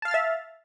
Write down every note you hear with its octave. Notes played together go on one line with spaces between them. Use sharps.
E5 F5 A5 F6 A6